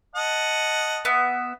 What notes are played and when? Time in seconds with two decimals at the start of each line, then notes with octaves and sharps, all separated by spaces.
0.16 D#5 F#5 A5
1.05 B3 E5